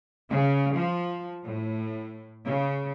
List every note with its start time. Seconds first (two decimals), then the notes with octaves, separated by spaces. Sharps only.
0.30 C#3
0.75 F3
1.44 A2
2.46 C#3